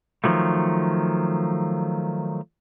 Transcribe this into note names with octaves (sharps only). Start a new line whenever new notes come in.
D#3 F3 F#3 A3